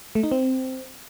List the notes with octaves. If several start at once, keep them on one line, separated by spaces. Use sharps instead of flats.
A3
D#4
C4